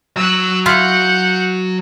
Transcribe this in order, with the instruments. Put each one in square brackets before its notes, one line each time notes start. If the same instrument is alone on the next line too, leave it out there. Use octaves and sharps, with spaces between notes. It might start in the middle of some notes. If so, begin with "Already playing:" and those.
[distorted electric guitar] F#3 [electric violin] E6 F#6
[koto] E4 F4 F5 [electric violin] F#5 G6